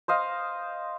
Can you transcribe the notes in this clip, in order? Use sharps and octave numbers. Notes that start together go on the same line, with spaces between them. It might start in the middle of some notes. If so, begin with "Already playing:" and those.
C5 D#5 F5